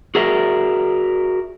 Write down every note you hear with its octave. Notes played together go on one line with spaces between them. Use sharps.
F#4 G#4 A#4 D5 E5